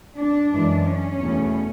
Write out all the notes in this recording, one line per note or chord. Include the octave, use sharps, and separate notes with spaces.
D4
F#2 E3 G#3
C#4
E2 B2 A3